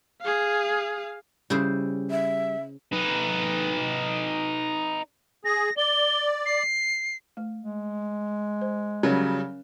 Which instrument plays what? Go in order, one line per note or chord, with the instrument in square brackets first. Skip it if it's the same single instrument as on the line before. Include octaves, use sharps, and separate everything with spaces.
[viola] G#4 F5
[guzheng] C#3 E4 C5 [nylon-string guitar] G3
[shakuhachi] E5
[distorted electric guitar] D#4 B4
[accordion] G#4 [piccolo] A#6
[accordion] D5 [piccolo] G7
[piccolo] C7
[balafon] A3
[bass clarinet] G#3
[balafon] C5
[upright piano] C#3 F#3 G3 [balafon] C#4 A#4 C#5